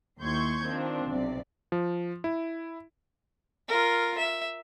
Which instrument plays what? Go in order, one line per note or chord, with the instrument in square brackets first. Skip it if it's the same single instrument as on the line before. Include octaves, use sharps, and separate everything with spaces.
[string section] D#2 E4 C6 C#6 G6 G#6
D#3 F3 C4 D4
B1 C3 D5
[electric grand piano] F3
E4
[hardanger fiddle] F4 A#4
E5